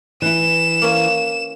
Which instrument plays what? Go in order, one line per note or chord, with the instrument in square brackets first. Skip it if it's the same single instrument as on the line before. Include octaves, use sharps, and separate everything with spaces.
[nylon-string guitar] E3 E4 [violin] E7
[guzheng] A#3 C#4